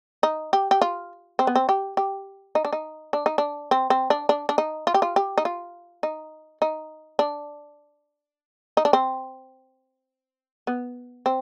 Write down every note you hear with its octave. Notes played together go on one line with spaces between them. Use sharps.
D#4
G4
G4
F4
C4
B3
C4
G4
G4
D#4
D4
D#4
D4
D#4
D4
C4
C4
D4
D4
D4
D#4
F4
G4
F4
G4
D#4
F4
D#4
D#4
D4
D#4
D4
C4
B3
C4